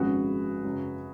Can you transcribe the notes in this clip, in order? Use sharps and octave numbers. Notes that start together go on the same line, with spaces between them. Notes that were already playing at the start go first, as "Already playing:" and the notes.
Already playing: G#1 F#2 F3 G#3 C#4 F#4 G#4 B4
F#2 C#3 G#3